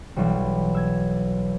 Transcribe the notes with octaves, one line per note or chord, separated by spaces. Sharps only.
B1 E3 F#3 G3
E6 G#6